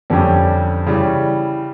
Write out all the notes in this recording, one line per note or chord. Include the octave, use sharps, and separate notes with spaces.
F2 D3 G3 C#4 G4
C#3 E3 G3